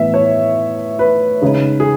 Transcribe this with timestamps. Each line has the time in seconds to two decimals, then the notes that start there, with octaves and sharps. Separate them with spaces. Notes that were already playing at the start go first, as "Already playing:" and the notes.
Already playing: A2 E3 B3 E5
0.14 C#5
0.99 B4
1.42 C#3 G#3 D#4
1.80 G#4